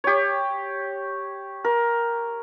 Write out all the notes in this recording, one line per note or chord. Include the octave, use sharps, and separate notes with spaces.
G4 C#5
A#4